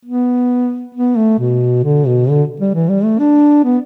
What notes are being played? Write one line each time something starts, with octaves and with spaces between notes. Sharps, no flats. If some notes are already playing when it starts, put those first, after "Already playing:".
B3
B3
A3
B2
D3
B2
D3
G3
E3
G3
A3
D4
B3